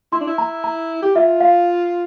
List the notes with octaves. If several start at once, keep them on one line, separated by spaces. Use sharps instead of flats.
E4 C6
D4
E4
A#5
A#5
G4
F4 E5
F5